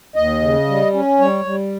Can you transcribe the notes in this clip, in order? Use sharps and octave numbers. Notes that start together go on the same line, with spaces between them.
D#2 D#5
C#3
G3
C#4
G3 C#5
G3